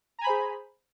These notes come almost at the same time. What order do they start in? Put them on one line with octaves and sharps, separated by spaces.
A#5 G#5 B5 C5 G#4